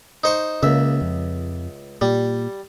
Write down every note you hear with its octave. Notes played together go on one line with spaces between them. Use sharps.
D#4 C5 C#6
C#2 C#3 A#3 E5
F2
A#2 G3